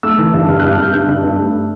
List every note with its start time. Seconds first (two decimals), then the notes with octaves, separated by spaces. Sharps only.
0.03 A3 E6
0.18 E3
0.34 G2
0.49 G2 F6
0.59 G2 F#6
0.71 F6
0.79 G2 G6
0.93 G2 F#6
1.08 G2
1.24 G2
1.38 A3